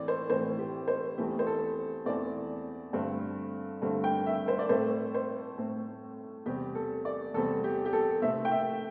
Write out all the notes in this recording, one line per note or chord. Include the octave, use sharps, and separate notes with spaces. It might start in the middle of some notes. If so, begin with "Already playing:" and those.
Already playing: A2 E3 C4 D5
C5
A2 E3 C4 C5
G4
C5
E2 E3 A3 C4 G4
C5
A4
E2 E3 A3 C4 D5
G2 D3 A3 C4
G2 D3 A3 C4
G5
E5
C5
D5
A2 A3 C4 C5
C5
A2 A3 C4
E2 C3 G3 C4 G4
A4
D5
E2 C3 G3 C4 A4
G4
G4
A4
C3 A3 C4 E5
G5
E5